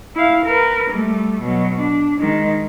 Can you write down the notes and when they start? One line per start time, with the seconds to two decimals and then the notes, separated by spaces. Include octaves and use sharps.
0.16 E4 F5
0.45 A#4 B4
0.91 G3 A3
1.42 B2 F#3
1.80 D4
2.19 D#3 G#3